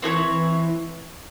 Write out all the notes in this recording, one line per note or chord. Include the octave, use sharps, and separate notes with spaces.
E3 C4 E4 A4 C#5
E3